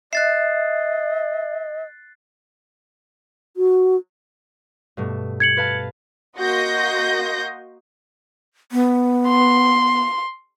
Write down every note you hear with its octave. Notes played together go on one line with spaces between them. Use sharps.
D#5 E5 F#6 A6 C7
F#4
G2 B2 A3
G#6 C#7 F#7
B4 F5 A5
A#3 F#4 D#5 C6 G6 A#6
B3
C6